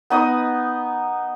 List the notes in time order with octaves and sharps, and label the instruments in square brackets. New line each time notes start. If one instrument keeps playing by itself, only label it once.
[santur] B3 D#4 D#5 D#6